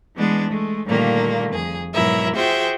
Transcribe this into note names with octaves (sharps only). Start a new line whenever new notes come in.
E3 G#3 B3 D4
G#3 A3
A#2 D3 D#3 G3 A3 A#3
F2 G#4
G#2 B2 F#3 E4 A#4 E5
F4 F#4 G#4 C5 E5 G5